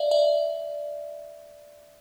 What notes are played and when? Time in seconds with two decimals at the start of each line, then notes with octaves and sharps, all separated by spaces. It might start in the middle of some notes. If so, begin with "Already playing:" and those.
Already playing: D5 E5 F5
0.11 D5 E5